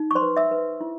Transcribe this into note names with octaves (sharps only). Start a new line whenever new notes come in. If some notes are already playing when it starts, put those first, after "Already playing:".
Already playing: D#4
C#6
C5 C6
B4
E5 E6
B4
E4